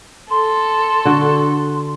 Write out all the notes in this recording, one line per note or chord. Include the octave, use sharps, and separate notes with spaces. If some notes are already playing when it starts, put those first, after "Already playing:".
A4 C6
D3 F#4